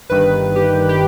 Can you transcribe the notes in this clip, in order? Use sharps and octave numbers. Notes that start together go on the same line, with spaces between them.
G1 G2 D#3 B4
G4
G4